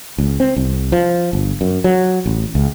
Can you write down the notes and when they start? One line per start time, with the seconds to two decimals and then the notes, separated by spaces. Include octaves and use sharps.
0.18 C#2
0.40 C4
0.56 C2
0.92 F3
1.33 G1
1.61 F#2
1.84 F#3
2.26 A1
2.55 C#2